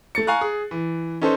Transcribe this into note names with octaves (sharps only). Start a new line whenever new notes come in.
A3 A6 C#7
F5 G#5 A#5 C#6 F#6
G#4
E3
C#4 D#4 A4 B4 C5